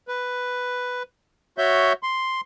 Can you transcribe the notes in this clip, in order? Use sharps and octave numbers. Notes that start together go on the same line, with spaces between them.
B4
F#4 C#5 E5 G6
C6